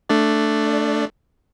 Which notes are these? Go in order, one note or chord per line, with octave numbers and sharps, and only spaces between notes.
A3 D4 D5